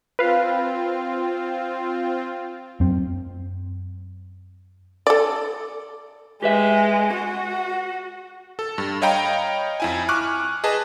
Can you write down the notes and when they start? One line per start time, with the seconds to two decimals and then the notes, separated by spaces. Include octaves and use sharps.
0.19 C4 F4 B4 F5
2.80 F#2 C4
5.07 A4 D5
6.43 G#3 G4 B4 E5
7.14 F#4
8.59 A4
8.78 G2
9.02 C#5 D#5 F5 G5 A#5 B5
9.80 F2 E4 G#5
10.09 G#5 C#6 D6 F6 F#6
10.64 G#4 B4 D#5 A5